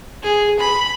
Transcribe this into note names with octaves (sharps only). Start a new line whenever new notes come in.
G#4
B5